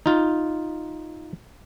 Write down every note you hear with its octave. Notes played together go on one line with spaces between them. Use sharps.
D#4 F4